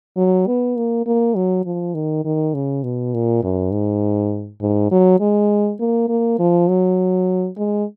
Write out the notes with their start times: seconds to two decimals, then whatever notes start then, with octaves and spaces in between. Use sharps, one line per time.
0.17 F#3
0.47 B3
0.76 A#3
1.06 A#3
1.36 F#3
1.65 F3
1.94 D#3
2.25 D#3
2.54 C#3
2.83 B2
3.13 A#2
3.43 F#2
3.72 G#2
4.61 G#2
4.91 F#3
5.20 G#3
5.80 A#3
6.08 A#3
6.39 F3
6.68 F#3
7.57 G#3